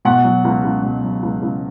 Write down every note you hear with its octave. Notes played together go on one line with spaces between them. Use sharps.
B2 F#5
F#3
C#2
C#2
B2
F#3
C#2
C#2